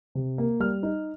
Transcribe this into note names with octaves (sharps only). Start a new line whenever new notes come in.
C3
A#3
G3 F6
D#4